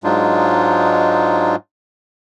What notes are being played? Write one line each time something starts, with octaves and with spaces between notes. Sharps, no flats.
G#2 F#3 G#3 D4 D#4 F4